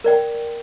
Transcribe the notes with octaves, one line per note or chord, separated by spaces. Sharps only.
A#4 D5 G5